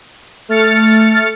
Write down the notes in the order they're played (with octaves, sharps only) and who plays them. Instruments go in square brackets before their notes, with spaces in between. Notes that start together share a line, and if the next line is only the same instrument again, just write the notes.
[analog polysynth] A3 F6 A6 C#7